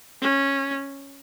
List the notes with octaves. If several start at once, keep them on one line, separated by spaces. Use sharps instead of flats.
C#4